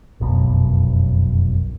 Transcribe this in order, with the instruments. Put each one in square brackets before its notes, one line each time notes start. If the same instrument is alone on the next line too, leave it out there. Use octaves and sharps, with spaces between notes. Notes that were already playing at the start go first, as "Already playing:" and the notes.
[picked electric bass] F1 B1 F#2 B2